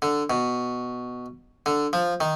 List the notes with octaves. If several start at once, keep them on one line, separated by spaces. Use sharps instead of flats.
D3
B2
D3
F3
D#3